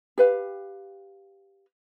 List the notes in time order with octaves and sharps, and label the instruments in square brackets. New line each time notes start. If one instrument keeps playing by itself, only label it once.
[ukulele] G4 B4 F5